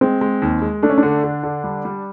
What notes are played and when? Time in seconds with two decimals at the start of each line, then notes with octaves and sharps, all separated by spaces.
0.01 G#3 C4
0.21 G#3
0.42 D#2
0.62 G#3
0.83 A3 D4
0.90 C#4
0.98 D4
1.03 D3
1.24 D3
1.43 D3
1.64 G3
1.85 G3